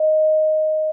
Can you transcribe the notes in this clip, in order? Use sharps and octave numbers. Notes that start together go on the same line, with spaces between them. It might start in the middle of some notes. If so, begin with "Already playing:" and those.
Already playing: D#5